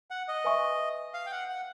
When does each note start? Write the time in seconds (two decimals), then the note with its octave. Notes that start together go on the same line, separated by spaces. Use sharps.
0.11 F#5
0.28 D#5
0.44 B4 E5 G#5 C#6
1.14 F5
1.26 G5
1.32 F#5
1.49 F#5